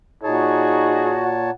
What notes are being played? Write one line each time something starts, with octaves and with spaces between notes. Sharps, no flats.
A#2 D#4 F#4 G#4 C#5 A5
F#5